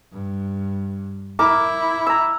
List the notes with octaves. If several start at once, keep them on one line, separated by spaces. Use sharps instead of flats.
G2
E4 A#4 D6
A#5 E6